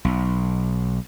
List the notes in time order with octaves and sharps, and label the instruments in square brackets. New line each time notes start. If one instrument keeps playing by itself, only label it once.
[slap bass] B1